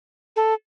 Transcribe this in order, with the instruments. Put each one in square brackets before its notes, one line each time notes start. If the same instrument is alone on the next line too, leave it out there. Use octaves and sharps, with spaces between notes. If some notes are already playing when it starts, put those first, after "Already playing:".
[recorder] A4